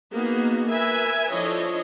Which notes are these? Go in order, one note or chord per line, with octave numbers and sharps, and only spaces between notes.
A#3 B3 D#4 F#4 G#4
A#4 B4 E5 G#5
F3 D4 E4 A4 C#5 D#5